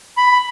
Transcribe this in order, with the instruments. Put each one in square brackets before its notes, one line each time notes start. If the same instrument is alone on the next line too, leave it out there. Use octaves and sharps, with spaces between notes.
[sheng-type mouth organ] B5